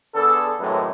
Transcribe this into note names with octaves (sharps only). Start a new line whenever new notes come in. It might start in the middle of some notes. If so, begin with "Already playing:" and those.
D3 B3 G#4 A4
G#1 F#2 A2 G#3 A3 B4